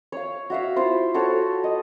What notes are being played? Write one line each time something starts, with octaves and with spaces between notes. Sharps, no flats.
C#5 F5
F#4 E5 F5
E4 F4 C5
F#4 A4 C5 C#5
D#5